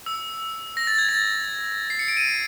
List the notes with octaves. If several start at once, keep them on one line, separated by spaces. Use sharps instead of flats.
E6
A#6
A6
G#6
A6
C7
C#7
D7
D#7